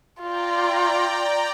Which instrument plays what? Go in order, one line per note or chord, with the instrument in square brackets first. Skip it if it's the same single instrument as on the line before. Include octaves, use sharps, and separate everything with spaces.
[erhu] F4 [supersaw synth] D5 G5 A#5